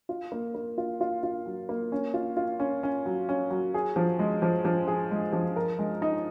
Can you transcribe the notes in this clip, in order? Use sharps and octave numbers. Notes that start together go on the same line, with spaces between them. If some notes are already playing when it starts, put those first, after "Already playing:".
F4
A#3
A#3
F4
F4
F4
F#3
A#3
C#4
F4
F4
C#4
C#4
F#3
C#4
F#3
G#4
F3
G#3
F3
F3
G#4
G#3
F3
A#4
G#3
D#4